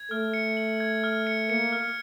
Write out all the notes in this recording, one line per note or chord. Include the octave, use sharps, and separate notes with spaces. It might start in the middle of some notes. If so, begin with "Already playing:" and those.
Already playing: G#6
A3 F6
C#7
F#7
G#6
F6
C#7
A#3 C#7
F6